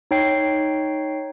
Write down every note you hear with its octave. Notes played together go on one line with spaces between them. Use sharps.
D#4 C#5 G5 C7